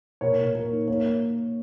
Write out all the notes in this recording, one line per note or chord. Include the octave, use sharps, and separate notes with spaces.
A#2 A#4 C#5
A#2
A#3 A#4
D#4
A#3 A#4 C#5
A#3